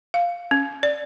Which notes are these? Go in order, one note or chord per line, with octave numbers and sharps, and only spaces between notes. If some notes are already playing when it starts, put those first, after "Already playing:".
F5
C#4
D5